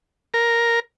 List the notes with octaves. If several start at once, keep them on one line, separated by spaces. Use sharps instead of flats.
A#4